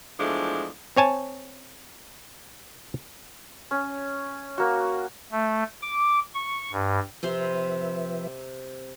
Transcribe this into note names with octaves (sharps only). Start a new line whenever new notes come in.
E2 F3 G#3 A3 D4
C4 C#5 G#5 A5
C#4
A#3 F#4
A3
D6
C#6
G2
C3 F3 C4 B4 E5 C6